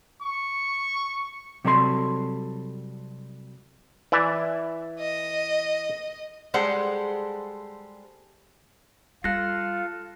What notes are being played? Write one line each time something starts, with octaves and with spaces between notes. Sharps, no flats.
C#6
C3 F#3 G3 A4 C#5 C6
E3 D5 E5
D#5
G3 G#3 G#4 A4 C5 F#5
G3 F4 A4 F5 F#6 A#6